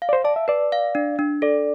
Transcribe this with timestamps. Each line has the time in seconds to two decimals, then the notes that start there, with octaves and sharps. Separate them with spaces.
0.02 F5
0.09 D5
0.13 C5
0.24 D5 A5
0.36 E5
0.48 B4 D5
0.72 F5
0.95 D4
1.19 D4
1.42 A4 D5